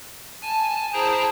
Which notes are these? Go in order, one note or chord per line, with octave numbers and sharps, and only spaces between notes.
G#5 A5
E4 G#4 C5 G5 A5 A#5